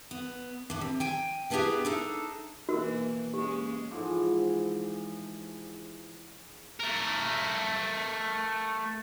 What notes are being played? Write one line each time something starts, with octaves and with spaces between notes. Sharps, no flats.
B3
A2 D4
C3
G5 G#5
G3 B3 D4 E4 G4 G#4
D4 D#4 A4
B2 E3 A#3 F#4 A#4
G#3 A#3 C#4 G4
G#2 E3 F3 D6
A3 A#4